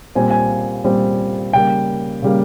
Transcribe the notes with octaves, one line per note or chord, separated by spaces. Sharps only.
A#2 G3 C4 G#5
G#5
A#2 G3 C4
C#3 G3 A#3 G5
C#3 G3 A#3